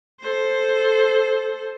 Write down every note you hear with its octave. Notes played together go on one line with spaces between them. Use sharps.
A4 C5